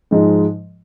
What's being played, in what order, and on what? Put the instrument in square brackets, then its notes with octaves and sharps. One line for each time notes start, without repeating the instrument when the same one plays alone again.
[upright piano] G#2 F3 G#3